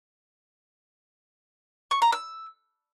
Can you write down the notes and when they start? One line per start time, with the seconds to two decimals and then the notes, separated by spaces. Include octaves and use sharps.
1.91 C#6
2.02 A#5
2.12 E6